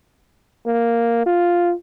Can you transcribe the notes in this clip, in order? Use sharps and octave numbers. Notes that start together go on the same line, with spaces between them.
A#3
F4